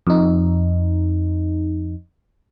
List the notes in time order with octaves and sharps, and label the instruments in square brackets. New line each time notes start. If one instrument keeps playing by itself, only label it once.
[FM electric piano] F2 D#4